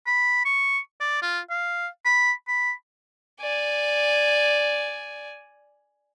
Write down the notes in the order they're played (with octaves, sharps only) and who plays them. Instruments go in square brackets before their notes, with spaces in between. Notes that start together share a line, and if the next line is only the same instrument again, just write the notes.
[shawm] B5
C#6
D5
F4
F5
B5
B5
[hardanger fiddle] D5 G#5